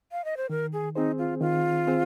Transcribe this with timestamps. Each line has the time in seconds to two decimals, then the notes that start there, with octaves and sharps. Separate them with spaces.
0.12 F5
0.25 D#5
0.37 C5
0.50 D#3 A#4
0.73 G#4
0.95 C4 D#4 G#4 C5
1.18 F4
1.41 D#3 F4
1.87 C4 G#4 C5